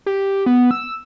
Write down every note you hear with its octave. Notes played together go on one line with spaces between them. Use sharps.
G4
B3
E6